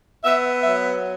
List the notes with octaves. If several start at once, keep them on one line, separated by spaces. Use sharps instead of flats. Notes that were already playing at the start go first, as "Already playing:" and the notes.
B3 E5
F#3 E5